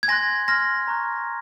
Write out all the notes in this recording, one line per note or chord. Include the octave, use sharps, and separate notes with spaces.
G#6
G#5 C6 F#6 A#6
C6 F6 A#6
A#5 C#6 F#6